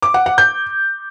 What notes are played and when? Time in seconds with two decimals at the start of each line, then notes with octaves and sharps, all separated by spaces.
0.02 D6
0.14 F#5
0.26 F#5
0.38 G6